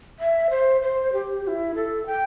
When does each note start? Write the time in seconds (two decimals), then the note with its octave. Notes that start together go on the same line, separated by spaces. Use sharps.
0.20 E5
0.50 C5
0.81 C5
1.13 G4
1.44 G4
1.48 E4
1.75 A4
2.06 G5